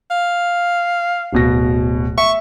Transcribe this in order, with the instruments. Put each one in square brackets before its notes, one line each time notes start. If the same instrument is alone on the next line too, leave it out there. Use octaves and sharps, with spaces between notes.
[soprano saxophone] F5
[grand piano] D1 B2 A#6
[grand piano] E5 [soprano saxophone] C#6